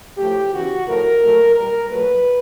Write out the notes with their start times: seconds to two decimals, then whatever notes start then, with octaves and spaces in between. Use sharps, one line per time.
0.18 A2 F3 A3 G4
0.52 E2 C#3 E3 F#4
0.87 A2 F3 A3 A#4
1.21 A#2 F#3 A3
1.55 A#2 G3 A#4
1.89 A#2 F#3 A3 B4